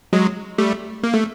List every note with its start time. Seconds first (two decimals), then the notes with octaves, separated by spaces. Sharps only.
0.13 F#3 G#3
0.58 G3 A3
1.03 A#3
1.14 A3